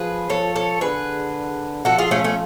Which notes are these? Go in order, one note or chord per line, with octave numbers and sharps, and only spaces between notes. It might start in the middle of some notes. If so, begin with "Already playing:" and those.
Already playing: F3 G#4 B4
F3 A4 C#5
A4 C#5
D3 G#4 B4
F3 F#4 A4
F4 G#4
A3 C#4
A3 C#4